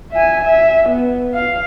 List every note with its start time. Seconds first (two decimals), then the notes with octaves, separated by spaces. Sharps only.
0.12 E5 G#5
0.44 E5
0.89 B3
1.34 F5